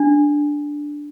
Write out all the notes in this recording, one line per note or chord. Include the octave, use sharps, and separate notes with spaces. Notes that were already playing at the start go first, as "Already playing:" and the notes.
Already playing: D4